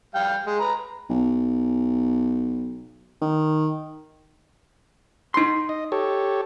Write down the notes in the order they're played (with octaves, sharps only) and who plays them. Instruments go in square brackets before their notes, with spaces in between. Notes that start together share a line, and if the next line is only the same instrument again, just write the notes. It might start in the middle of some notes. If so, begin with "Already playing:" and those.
[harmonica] G3 F5 G5
G#3
B4 A#5
[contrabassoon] B1
D#3
[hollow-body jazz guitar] D#4 C6
[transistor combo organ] D#5
G4 A4 C#5